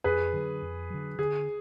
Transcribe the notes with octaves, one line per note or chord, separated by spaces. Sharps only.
F2 G#4 B4
D3 F#3
F2
D3 F#3
D3 G#4